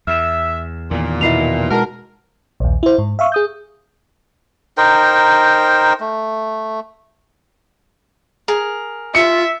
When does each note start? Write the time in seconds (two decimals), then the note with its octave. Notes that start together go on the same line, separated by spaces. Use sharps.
0.07 E2 E5 F6 E7
0.91 E2 A#2 D#3
1.21 B2 D#4 E4 E5 C7 F7
1.71 G#3 F#4 A#4 F#5 A5
2.60 A#1 D#2
2.83 E4 C5
2.98 G#2
3.19 E5 F5 C#6 E6
3.32 G#4 D#6 G6
4.78 D#4 A#4 C5 G5
6.00 A3
8.48 G#4 A#4
9.15 F4 E5 C#7